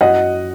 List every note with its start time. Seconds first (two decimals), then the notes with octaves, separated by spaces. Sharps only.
0.01 F#2 D#5 F#5